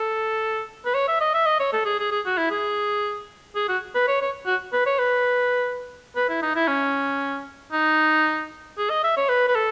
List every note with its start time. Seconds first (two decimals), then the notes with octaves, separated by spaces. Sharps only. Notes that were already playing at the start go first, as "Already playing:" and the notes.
Already playing: A4
0.86 B4
0.94 C#5
1.08 E5
1.21 D#5
1.34 E5
1.46 D#5
1.59 C#5
1.73 A4
1.85 G#4
1.99 G#4
2.11 G#4
2.26 F#4
2.38 E4
2.51 G#4
3.55 G#4
3.68 F#4
3.95 B4
4.08 C#5
4.21 C#5
4.46 F#4
4.73 B4
4.86 C#5
4.98 B4
6.16 B4
6.29 E4
6.42 D#4
6.56 E4
6.68 C#4
7.72 D#4
8.77 G#4
8.90 D#5
9.04 E5
9.17 C#5
9.29 B4
9.48 B4
9.55 A4